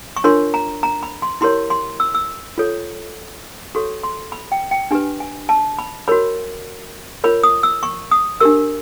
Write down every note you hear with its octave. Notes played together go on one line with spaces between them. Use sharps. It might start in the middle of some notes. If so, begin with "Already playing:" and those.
C#6
D4 F4 A#4 C#5 C6
A#5
A#5
B5
C6
E4 G4 A#4 C#5 C6
C6
E6
E6
F4 A4 C#5
F#4 A4 C#5 C#6
C6
B5
G5
G5
D4 G4 B4 G#5
G#5
A5
B5
F#4 A#4 C#5 B5
F4 A#4 C#5 B5
D#6
E6
C#6
D#6
D4 G4 A#4 E6